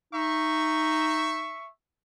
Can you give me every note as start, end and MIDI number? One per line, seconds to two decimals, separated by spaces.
0.13 1.55 63
0.13 1.69 76
0.13 1.69 85